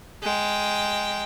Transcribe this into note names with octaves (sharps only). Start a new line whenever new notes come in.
G#3 G5